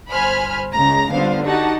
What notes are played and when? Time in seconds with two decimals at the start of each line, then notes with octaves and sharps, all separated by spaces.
0.11 G1 C5 G#5 B5 F6
0.74 C#2 C#3 G#3 A#5
1.12 D3 G3 B3 F4 C5 F5
1.44 D#4 F#4 G4 F#5 A5